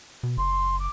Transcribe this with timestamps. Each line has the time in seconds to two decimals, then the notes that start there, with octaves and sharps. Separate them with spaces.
0.23 B2
0.37 F#1 C6
0.79 D6